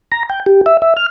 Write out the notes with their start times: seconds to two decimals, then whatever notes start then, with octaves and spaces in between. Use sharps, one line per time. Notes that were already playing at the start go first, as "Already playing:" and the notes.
0.12 A#5
0.30 G5
0.46 G4
0.66 E5
0.82 E5
0.97 F6